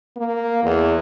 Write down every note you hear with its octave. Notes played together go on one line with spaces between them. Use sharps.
A#3
E2